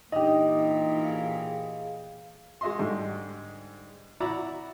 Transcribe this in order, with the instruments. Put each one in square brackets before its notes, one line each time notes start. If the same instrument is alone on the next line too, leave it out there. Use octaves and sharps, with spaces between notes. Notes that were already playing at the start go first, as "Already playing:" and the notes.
[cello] A#2 E3 [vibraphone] D4 D#4 [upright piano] G4 D#5
[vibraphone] G#4 F5
[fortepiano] G#3 F#4 D#5 E5 C6
G#2 D3 G3 G#3
E4 F#4 D5 E5 A#5 B5